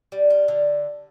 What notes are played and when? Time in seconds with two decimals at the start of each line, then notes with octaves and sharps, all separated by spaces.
0.12 G3
0.30 F4
0.48 D3